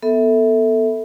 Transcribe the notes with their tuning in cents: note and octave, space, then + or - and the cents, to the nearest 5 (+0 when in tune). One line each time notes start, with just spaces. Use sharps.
B3 +0 A4 +10 E5 -15